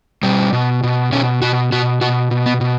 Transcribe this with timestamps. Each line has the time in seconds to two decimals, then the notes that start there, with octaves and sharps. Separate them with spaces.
0.23 B2 G3
0.53 B2
0.83 B2
1.12 B2 C#4
1.42 B2 F#4
1.72 B2 F#4
2.01 B2 F#4
2.31 B2
2.46 B3
2.61 B2